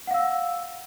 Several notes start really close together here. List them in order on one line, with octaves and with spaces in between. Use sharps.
F#5 F5 E6